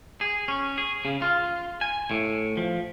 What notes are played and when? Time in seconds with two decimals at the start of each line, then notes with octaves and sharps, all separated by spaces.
0.21 G#4
0.48 C#4
0.78 G#4
1.05 C#3
1.22 F4
1.81 G#5
2.11 A2
2.57 F3